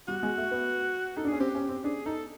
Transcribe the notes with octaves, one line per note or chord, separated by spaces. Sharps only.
G3 F#4
G#3
A3
B3
D#4 A4
D4
C#4 G#4
C4 G4
C#4
C4
D4 G#4
D#4 A4